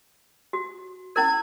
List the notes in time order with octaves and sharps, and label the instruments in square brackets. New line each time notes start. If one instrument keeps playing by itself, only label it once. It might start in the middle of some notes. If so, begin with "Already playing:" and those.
[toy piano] F#4
[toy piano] C#4 E4 A#4 [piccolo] G#6